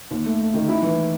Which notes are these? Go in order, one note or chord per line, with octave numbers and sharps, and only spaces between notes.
D#2
A3
A3
D#3
E4
E3